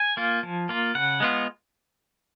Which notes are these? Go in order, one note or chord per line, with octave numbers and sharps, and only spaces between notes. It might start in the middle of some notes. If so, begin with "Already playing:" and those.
Already playing: G#5
A#3 F4
F3
A#3 F4
C#3 F#5
G#3 B3 F4